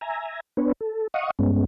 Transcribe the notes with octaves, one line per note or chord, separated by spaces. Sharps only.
E5 G#5 A#5
B3 D4 B4 C#5
A4
D#5 F5 F#5 C#6 D#6
G2 G#3 B3 C#4